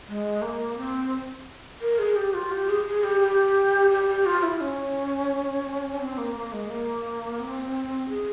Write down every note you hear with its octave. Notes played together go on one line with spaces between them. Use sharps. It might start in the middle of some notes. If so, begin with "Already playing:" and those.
G#3
A#3
C4
A#4
G#4
G4
F4
G4
G#4
G#4
G4
G4
G4
G4
F4
E4
C#4
C4
A#3
A#3
G#3
A#3
C4
G#4